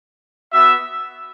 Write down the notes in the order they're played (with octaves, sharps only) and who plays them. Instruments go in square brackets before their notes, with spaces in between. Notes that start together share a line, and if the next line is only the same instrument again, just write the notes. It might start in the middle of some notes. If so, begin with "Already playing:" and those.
[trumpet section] B3 F#4 E5